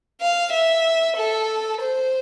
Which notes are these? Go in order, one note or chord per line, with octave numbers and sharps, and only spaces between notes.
F5
E5
A4
C5